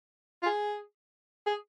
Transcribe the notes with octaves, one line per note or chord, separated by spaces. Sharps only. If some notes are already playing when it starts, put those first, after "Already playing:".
F4
G#4
G#4